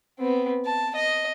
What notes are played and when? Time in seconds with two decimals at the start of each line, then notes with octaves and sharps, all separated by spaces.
0.19 B3 C4
0.65 A5
0.96 D#5